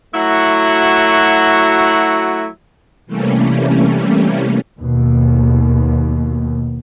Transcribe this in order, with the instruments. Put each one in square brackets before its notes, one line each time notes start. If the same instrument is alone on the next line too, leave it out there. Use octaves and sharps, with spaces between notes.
[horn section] F#3 A3 E4 F#4
[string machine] C3 E3 G3 A3 A#3 C#4
[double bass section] D#2 B2